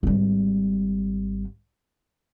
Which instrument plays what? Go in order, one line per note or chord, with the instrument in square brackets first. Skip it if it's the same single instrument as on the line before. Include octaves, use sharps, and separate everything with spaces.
[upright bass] G#1 G3